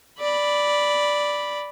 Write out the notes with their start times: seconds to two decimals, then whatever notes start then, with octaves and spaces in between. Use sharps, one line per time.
0.19 D5 B5